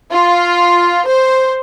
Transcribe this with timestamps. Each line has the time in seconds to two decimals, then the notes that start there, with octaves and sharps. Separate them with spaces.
0.11 F4
1.07 C5